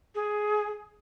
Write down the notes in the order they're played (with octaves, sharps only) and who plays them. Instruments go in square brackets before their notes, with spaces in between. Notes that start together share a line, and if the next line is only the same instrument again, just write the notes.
[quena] G#4